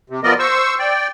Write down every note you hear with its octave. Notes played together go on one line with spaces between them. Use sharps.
C3
F3 B3 A#4 D5 D#5
C5 C#6 E6
D5 G5